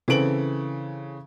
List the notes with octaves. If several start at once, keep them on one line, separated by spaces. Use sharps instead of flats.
C#3 E3 C4 A4 D7 F#7